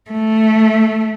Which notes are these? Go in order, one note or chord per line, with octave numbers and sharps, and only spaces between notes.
A3